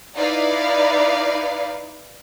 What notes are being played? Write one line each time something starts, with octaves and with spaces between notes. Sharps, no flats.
D#4 E4 B4 D5 F5